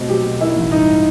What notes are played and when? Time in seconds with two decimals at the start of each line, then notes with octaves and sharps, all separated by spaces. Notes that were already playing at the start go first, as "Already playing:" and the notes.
Already playing: B2 A3 C4
0.08 F#3 G4
0.24 B2
0.41 D#3 E4
0.56 A1
0.72 G2 D#4